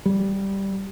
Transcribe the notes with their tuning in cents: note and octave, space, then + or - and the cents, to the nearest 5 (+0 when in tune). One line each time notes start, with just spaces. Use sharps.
G3 -5